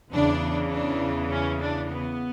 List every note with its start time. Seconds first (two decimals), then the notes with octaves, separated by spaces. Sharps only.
0.11 E2 C#3 E3 D4
0.70 D4
1.30 C#4
1.59 D4
1.89 B3